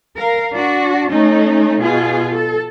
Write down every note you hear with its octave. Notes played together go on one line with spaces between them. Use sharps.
A#4 F5
D4 F#4
A3 C#4 D#4
B2 F4 G#4
A4